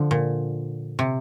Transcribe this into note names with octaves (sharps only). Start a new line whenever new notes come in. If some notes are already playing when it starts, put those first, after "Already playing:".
Already playing: D3 F3
A#2
C3